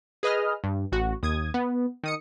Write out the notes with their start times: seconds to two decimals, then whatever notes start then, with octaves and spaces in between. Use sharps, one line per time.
0.23 G#4 B4 D#5 D#6 F6
0.64 G2
0.92 A1 F#4
1.23 D#2 D#6 G#6
1.54 B3
2.03 D#3 D#6 C#7